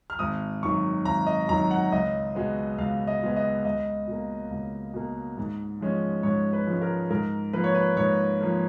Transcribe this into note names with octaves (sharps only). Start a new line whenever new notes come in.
F6
G#1 D#6
F#2 D#3 C#6
G#1 A#5
D#5
F#2 D#3 A#5
F#5
C#2 D#5
B2 G#3 B3
C#2 F5
D#5
B2 G#3 B3
D#5
C#2 D#5
B2 A#3
C#2
B2 A#3
G#2
F3 G#3 C#4
G#2 C#5
B4
F3 G#3 C#4
A#4
G#2 A#4
F3 A#3 B4
C#5
B4
G#2 C#5
F3 A#3